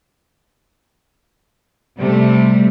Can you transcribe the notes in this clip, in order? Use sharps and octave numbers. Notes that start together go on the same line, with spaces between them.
C3 G3 A3